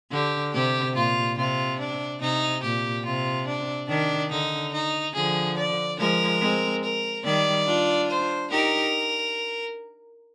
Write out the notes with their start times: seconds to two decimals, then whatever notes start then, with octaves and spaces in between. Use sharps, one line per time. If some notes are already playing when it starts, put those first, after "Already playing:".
0.11 D3 G4
0.53 C3 G4
0.95 A#2 F4
1.37 C3 F4
1.79 D4
2.21 C3 D#4
2.63 A#2 G4
3.05 C3 F4
3.47 D4
3.89 D#3 D4
4.30 D3 D#4
4.73 D#4
5.15 D3 F3 G#4
5.57 D5
5.99 F3 G#3 A#4
6.41 G#3 C4
6.83 A#4
7.25 D#3 G3 D5
7.67 D4 F4
8.09 C5
8.51 D#4 G4 A#4